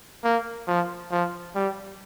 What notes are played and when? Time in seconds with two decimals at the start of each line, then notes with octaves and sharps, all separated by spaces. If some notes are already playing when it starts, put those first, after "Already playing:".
0.24 A#3
0.67 F3
1.11 F3
1.55 G3